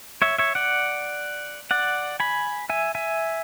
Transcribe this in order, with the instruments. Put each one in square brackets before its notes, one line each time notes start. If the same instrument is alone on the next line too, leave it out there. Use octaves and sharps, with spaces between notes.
[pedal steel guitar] C#5 E5
C#5 E5
D5 F#5
D5 F#5
G#5 B5
E5 G#5
E5 G#5